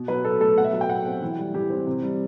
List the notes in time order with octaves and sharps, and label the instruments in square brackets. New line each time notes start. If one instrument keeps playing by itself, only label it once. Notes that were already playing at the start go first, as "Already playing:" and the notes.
Already playing: [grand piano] B2
F#3 B4
B2 A4
A3 A4
B2 F#5
E5
F#3
G5
B2 F#5
C4
E3
G3
E3 G4
C4
C3
G3